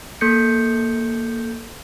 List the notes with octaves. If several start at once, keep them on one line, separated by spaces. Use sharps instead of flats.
A#3 A4 G6 C#7